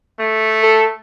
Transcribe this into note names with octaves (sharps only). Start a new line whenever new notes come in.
A3
A4